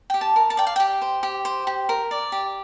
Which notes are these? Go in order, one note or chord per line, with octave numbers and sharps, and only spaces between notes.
G4 G5
A5
A#4
A5
D5 G5
F5
G4 G5
C5
G4
C5
G4
A#4
D5
G4